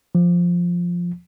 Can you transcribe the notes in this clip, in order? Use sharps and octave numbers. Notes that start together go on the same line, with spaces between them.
F3